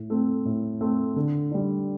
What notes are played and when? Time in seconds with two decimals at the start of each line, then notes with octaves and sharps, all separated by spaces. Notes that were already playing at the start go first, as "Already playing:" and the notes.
Already playing: A2
0.10 A3 C4
0.45 A2
0.81 A3 C4
1.16 D3
1.51 G3 D4